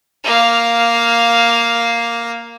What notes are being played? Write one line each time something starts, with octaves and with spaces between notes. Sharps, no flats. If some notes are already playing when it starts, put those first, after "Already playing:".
A#3 F5